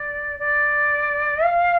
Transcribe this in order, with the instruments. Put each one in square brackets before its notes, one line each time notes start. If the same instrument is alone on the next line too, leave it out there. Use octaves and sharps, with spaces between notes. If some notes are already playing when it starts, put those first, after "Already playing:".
Already playing: [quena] D5
D5
F5